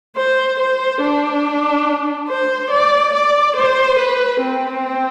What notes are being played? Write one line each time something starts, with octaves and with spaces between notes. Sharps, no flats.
C5
C5
D4
C5
D5
D5
C5
B4
C4